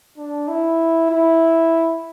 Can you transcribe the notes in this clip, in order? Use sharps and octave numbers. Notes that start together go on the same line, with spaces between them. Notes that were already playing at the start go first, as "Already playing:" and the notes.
D4
E4
E4